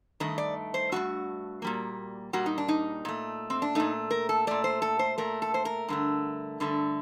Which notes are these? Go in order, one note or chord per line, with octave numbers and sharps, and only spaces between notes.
G2 D#3 A3 D#5
D5
C5
G2 D#3 A3 F#4
A#2 G3 A#3
A#2 G3 A#3 F#4
D#4
D4
D#4
A#2 A3
C4
D4
A#2 A3 D#4
A#4
A4
A#2 A3 D5
C5
A4
C5
A#2 A3 A#4
A4
C5
A#4
G2 D3 A3
G2 D3 A3